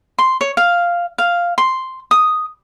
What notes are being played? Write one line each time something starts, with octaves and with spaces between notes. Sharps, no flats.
C6
C#5
F5
F5
C6
D#6